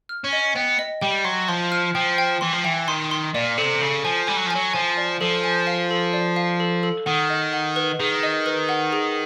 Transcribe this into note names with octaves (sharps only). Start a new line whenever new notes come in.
F6
C#4
D#5
B3 G5
D#5
G3 G5
F#3 C6
F3 C6
F6
F3 G5
G5
E3 C6
F3
E3 G5
D#3 C6
C6
A#2 D5
C3 A4
C#3 A4
F3 G#5
G3 G#5
F#3
F3
F#3 G#5
F3 G#5
D5
F3 A4
G#5
F5
A4
D5
F5
A4
A4
D#3 F#5
D#5
F#5
B4
D#3 G#4
D#5
B4
F#5
G#4